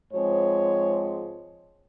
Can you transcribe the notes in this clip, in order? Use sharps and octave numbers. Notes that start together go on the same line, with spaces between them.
G#2 F3 G#3 C4 C#5